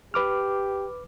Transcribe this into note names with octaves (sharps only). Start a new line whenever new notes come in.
G4 B4 D6 F6